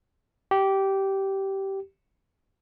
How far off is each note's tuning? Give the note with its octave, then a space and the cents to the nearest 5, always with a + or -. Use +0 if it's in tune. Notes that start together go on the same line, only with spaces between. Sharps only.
G4 -15